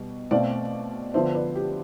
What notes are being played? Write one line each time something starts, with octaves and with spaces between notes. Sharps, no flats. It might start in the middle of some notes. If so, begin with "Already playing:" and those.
Already playing: B2 G3
B2 A3 C4 D5 F5
D3 F3 B3 D4 C5 E5
B4 D5
G4